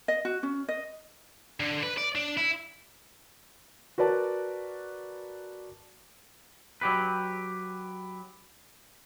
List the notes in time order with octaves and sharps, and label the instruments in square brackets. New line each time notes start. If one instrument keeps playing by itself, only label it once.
[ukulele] D#5
F#4
C#4
D#5
[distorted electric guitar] D3
B4
D5
D4
E4
[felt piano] F#4 A#4 B4 D5 A5
[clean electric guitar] F#3 G4 B4